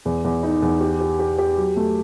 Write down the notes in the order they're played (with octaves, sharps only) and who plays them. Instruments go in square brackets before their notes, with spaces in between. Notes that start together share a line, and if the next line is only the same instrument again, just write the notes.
[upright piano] E2
E2
D#4
E2
G4
G4
G4
G4
F#3
A3